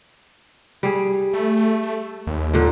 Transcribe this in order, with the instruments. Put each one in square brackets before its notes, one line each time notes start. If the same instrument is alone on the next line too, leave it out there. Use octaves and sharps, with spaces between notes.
[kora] G3 G#4
[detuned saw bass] A3
D#2
[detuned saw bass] D#2 [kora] A#2 D3